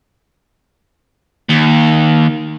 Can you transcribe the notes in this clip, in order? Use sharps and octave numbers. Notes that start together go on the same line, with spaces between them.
D#2